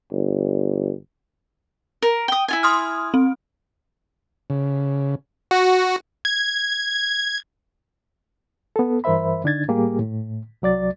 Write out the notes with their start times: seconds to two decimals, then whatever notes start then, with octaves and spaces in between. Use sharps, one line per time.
0.12 G1
2.02 A#4
2.28 G5 D#6
2.48 E4 F4 G#5
2.63 C6 D#6 F6
3.14 C4
4.50 C#3
5.51 F#4
6.25 G#6
8.76 B3 A4
9.04 G2 E3 A#4 C5 E5 B5
9.44 D3 D4 D#4 G#6 A6
9.68 A2 G3 A#3 G4 G#4
9.99 A2
10.62 C2 F#3 D5 A6